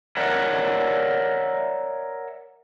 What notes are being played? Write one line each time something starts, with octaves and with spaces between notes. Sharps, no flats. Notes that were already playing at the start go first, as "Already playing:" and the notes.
A#4 C#5 D5 E5 F#5